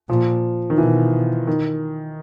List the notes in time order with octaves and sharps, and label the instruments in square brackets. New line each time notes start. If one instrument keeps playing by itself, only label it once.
[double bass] A#2 [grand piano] F3
[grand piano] D#3
[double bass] B2 [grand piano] E3
[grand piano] D#3